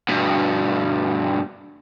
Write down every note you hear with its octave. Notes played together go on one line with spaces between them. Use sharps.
G2 B2